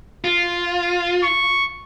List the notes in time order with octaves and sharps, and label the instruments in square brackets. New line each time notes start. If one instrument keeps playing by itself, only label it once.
[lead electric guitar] F4
[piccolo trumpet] C#6